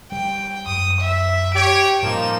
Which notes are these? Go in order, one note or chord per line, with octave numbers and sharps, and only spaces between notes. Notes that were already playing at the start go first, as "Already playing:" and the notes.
G3 G5
F#2 D#6
E5
G4 C#5 D7
A2 F3 G3 A#3 C4 D#4 E7